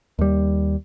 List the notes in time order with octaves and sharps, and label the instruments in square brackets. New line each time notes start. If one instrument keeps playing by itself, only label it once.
[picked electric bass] D#2 G3